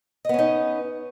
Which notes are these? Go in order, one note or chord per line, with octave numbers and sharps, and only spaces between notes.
B3 C#4 D#4 D#5